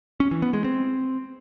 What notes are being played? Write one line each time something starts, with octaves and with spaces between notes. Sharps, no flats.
C#4
E3
B3
G#3
C4